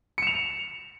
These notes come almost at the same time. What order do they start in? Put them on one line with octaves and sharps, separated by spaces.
C#7 E7 F7